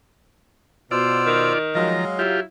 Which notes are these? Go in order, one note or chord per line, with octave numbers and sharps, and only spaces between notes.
B2 F4 C5 D5 E6
D#3
F3 F#3 G#3 D#5 F5 A#5
E4 F4 G4